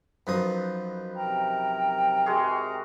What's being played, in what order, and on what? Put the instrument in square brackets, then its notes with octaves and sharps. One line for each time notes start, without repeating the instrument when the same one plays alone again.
[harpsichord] F#2 F3 D#6 [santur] D#4 B4
[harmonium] C3 A#4 A#5 [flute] G5
[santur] G#3 F#4 G#4